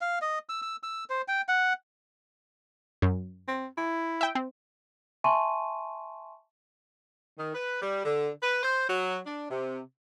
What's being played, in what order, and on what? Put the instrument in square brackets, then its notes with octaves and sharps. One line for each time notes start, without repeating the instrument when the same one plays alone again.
[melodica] F5
D#5
E6
E6
E6
C5
G5
F#5
[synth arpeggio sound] F#2
[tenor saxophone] C4
E4
[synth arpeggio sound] E5 G5
C4
[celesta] E5 G#5 A5 C6 C#6 D#7
[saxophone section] D#3
B4
G3
D3
B4
C5
F#3
D4
C3